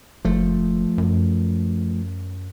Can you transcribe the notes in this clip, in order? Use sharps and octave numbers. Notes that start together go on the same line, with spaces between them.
F#1 F3 A3
F#2